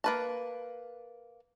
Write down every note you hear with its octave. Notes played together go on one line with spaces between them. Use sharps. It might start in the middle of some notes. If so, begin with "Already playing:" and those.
A#3 B4 A5